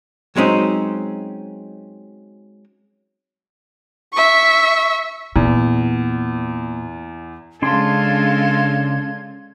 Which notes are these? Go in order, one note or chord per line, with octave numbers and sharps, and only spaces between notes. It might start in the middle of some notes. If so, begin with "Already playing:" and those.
F#3 G#3 C4 C#4 D#4
E5 C#6
E2 A#2
C#3 G#3 D4 F4 A4 C6 G#6